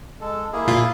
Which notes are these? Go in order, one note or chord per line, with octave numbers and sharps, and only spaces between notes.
G#3 A4
A#3 E4 G#4
A#2 F4